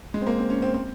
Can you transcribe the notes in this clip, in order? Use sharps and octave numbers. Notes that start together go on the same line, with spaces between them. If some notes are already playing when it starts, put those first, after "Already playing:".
G#3
C4
A#3
C4
C#4
C4
C4